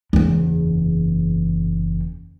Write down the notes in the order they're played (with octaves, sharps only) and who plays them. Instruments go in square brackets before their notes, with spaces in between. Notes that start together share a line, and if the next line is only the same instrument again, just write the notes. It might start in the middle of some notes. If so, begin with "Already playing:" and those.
[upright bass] F#1 E2